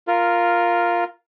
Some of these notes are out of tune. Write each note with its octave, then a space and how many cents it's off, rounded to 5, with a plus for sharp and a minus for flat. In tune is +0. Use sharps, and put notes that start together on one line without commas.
F4 +0 A#4 +0